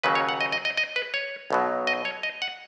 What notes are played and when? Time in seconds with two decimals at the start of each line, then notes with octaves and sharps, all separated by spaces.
0.04 D#2 C#3 F#3 B4
0.15 C#5
0.29 F#5
0.41 D#5
0.52 D#5
0.65 D#5
0.77 D#5
0.96 B4
1.14 C#5
1.50 B1 B2 F#3
1.87 D#5
2.05 C#5
2.23 D#5
2.42 F#5